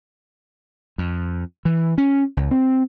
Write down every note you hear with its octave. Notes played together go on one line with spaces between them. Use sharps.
F2
E3
C#4
C#2
C4